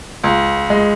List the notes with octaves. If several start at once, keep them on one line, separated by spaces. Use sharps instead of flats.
C#2
G#3